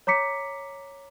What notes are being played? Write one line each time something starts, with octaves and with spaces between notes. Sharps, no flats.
C#5 A#5 D6 B6 C#7